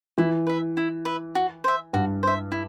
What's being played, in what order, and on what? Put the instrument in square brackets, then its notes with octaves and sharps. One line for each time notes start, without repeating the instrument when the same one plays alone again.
[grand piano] E3 [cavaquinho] E4
[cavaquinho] B4 E5
E4
B4 E5
F#4
C5 E5
[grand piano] G2 [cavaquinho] F#4
[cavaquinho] C5 E5
E4